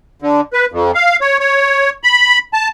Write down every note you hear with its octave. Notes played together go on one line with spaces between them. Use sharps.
D3
B4
F2
F5
C#5
C#5
B5
A5